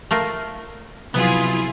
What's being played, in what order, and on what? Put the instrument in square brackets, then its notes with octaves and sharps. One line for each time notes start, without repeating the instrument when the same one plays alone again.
[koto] A3 F4 A#4
[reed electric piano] C3 F3 F#3 [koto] B3 [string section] E4 F4 G#4